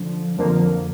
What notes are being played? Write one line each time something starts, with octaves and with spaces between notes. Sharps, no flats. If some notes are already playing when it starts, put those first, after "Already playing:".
Already playing: D3 F3
F2 D3 F3 A#3